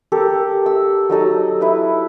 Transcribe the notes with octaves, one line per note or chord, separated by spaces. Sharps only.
G4 A4 A#4
E6
F#3 D#4 A4 D#5
E4 B4